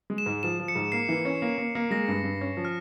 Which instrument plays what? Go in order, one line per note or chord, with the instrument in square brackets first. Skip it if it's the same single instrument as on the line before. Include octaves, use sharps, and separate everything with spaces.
[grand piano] G#3
[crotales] E7
[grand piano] G#2
[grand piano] F3 [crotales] E7
[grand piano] F3
[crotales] C#7
[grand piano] G#2
[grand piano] A#3 [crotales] C7
[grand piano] E3
C#4
A#3
A#3
A#3
[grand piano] G#3 [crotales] A#6
[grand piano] G2
G2
C#4
F3
[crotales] F6